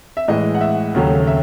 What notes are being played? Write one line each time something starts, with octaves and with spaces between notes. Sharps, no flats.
E5
A2 E3 G#3 D#5
F#5
E5
D#2 C#3 F#3 A3
E5